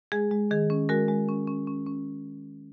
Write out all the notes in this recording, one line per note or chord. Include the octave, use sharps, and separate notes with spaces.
G#3 G#4
G#3
D#3 G#4
C#4
G#3 F#4 A#4
G#3
C#4
C#4
C#4
C#4